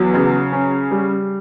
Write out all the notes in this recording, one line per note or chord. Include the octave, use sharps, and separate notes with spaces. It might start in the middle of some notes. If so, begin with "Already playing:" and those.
Already playing: E2 F#3
C#3
C#4
G3